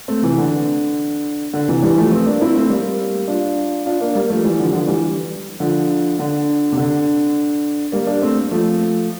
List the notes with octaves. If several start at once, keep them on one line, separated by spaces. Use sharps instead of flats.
A3 C4
C3 E3
D3
D3
C3 E3
E3 G3
F3 A3
A3 C4
A#3 D4
C4 E4
A3 C4
G3 A#3
D4 F4
D4 F4
A#3 D4
G3 A#3
F3 A3
E3 G3
D3 F3
D3 F3
E3 G3
D3 F3
D3
C3
D3
G3 A#3
A#3 D4
A3 C4
F3 A3